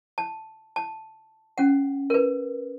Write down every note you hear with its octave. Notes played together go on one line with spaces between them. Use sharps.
A5
A5
C#4 F#5
A#4 B4